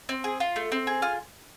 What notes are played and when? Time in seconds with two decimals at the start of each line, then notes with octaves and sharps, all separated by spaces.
0.09 C4
0.24 G#4
0.40 F4
0.56 A3
0.72 C4
0.87 G#4
1.02 F4 F6